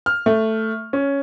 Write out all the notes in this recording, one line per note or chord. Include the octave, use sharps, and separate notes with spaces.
F6
A3
C#4